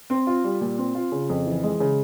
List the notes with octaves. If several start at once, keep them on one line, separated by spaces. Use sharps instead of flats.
C4
F4
G3
A#2
C4
F4
C#3
F2
E3
G#3
C#3